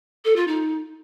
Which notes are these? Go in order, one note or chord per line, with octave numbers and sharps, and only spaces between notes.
A4
F4
D#4